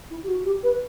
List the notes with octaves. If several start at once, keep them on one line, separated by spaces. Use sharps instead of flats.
E4
G4
F#4
G4
B4